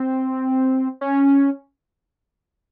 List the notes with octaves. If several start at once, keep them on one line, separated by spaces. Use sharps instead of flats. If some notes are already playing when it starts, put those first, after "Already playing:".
Already playing: C4
C#4